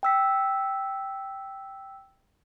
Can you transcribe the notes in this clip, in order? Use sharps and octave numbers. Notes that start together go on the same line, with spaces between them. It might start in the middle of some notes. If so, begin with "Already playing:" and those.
G5 E6 B6